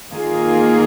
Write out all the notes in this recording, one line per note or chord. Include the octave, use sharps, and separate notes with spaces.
D#3 A#3 F4 G#4